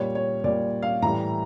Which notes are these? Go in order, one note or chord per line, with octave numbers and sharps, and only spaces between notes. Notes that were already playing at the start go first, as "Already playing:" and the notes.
Already playing: A#2 G3 C#5
C#5
A#2 G3 D5
F5
A2 E3 G3 A#5